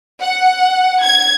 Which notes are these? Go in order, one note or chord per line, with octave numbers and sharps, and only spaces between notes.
F#5
G#6